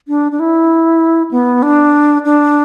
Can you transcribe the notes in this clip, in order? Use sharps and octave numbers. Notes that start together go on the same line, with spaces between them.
D4
D4
E4
B3
D4
D4